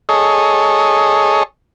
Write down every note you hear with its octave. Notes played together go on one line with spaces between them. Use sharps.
G#4 A4 C#5 D#5